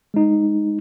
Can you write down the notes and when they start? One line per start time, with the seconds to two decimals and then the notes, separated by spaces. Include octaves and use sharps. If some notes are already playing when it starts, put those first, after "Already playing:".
0.14 G#3 D#4